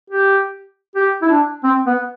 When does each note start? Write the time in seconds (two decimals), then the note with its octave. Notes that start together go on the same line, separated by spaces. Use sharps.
0.10 G4
0.96 G4
1.22 E4
1.29 D4
1.64 C4
1.87 B3